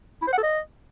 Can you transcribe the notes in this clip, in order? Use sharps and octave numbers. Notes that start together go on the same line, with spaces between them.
E4
C5
F#5
A4
D#5